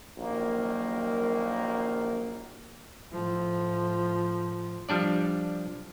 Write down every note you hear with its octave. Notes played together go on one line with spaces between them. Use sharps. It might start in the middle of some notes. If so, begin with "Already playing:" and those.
A#1 F#2 D#3 F#3 A#3
A2 F3
F3 G3 D4 D5